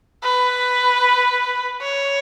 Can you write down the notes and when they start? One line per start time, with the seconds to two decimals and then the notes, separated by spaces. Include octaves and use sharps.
0.23 B4
1.82 C#5